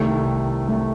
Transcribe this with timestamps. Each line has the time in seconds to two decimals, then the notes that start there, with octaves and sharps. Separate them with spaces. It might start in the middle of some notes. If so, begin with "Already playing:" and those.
Already playing: C2 C3 D#3 A3
0.68 A3